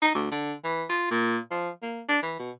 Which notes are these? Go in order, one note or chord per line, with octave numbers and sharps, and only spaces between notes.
D#4
D2
D3
E3
F4
A#2
F3
A#3
D4
E3
B2